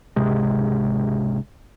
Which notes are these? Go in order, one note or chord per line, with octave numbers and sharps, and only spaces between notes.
G#1 C#2 C3 G#3